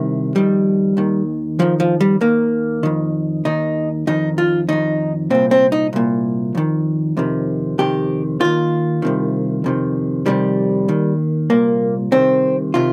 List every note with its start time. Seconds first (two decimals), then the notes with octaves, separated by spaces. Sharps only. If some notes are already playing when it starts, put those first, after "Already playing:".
Already playing: C2 C3 D#3
0.35 F2 D#3 G3
0.97 D#2 D#3
1.59 F2 D#3 F3
1.80 F3
2.00 G3
2.21 D#2 D#3 A#3
2.83 F2 D#3
3.45 D#2 D#3 D#4
4.07 F2 D#3 D#4
4.38 F4
4.69 F2 D#3 D#4
5.30 C2 A#2 C4
5.51 C4
5.72 D#4
5.93 C2 A#2
6.55 F2 D#3
7.17 F2 C3 D#3
7.78 F2 C3 D#3 G4
8.40 D#2 D#3 F4
9.02 C2 C3 D#3
9.64 F2 C3 D#3
10.26 F2 C3 D#3 G3
10.88 D#2 D#3
11.50 C2 A#2 A#3
12.12 C2 C3 D#3 C4
12.74 C3 D#3 F4